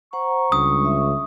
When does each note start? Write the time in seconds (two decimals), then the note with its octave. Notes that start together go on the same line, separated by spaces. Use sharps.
0.13 C5 F#5 A#5 C#6
0.52 C#2 G3 G#3 D4 D#6
0.85 E5